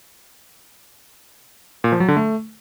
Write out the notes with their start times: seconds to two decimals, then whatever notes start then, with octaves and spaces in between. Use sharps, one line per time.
1.84 A#2
1.92 F3
2.00 F#3
2.08 D3
2.17 A3